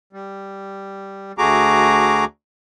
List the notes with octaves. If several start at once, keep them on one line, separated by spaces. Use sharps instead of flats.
G3
D2 A3 F#4 G#4 A#5 D6